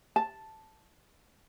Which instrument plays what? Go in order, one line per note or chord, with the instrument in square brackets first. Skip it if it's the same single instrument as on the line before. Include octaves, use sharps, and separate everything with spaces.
[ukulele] A5